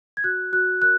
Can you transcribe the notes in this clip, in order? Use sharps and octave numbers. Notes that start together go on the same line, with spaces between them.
G#6
F#4 F#6
F#4 F#6
A#4 F#6